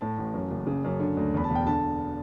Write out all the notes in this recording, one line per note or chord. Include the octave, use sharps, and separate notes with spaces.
A2 A5
A1
F#2
F#1
C#3
F#2
D3
D2
E2 B5
A5
E1 G5
D3 A5